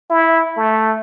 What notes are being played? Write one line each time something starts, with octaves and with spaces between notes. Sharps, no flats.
E4
A3